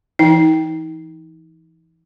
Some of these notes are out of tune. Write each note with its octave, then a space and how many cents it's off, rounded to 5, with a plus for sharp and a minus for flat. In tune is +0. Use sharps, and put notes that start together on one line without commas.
E3 +15 D#4 +35 G5 +0